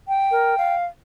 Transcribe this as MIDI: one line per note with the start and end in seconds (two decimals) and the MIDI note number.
0.08 0.75 79
0.31 0.55 70
0.58 0.85 77